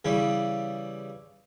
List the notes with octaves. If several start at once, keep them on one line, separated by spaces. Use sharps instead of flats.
C#3 E3 G3